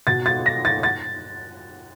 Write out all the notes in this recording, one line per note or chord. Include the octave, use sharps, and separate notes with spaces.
B2 A6
A6
A#6
A6
A6